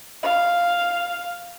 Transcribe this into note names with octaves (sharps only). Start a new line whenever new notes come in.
F5